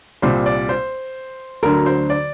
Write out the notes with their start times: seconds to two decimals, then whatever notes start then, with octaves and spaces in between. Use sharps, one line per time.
0.22 C2 A#2 G3 C5
0.46 D5
0.69 C5
1.63 D2 D3 F#3 A#4
1.86 C5
2.10 D5